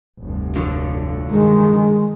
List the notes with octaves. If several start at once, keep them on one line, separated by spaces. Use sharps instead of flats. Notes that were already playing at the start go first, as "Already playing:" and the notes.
F1 D2 G2
D3 F3 F#3
G2 D#3 G#3